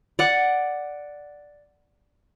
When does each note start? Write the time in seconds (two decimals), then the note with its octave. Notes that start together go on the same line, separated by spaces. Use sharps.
0.19 D5 F#5